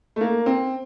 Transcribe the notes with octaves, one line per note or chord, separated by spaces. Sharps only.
A3
A#3
C4